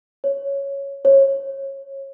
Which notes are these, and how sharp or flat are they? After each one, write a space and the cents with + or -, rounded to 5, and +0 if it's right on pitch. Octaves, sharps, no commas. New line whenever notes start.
C#5 +0
C#5 -25